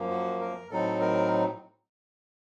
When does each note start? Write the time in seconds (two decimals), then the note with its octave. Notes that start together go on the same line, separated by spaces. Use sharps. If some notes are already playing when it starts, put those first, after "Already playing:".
Already playing: F#2 F3 A#3
0.10 F#4
0.41 A#4
0.71 A2 F#3 C4 D#4 A4
1.01 A#4